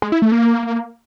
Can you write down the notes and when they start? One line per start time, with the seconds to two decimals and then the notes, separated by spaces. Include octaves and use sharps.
0.02 G#3
0.12 E4
0.22 A3
0.32 A#3